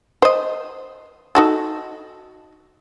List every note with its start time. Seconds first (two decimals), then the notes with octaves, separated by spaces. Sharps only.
0.22 C5 D#5
1.35 D#4 F#4 A4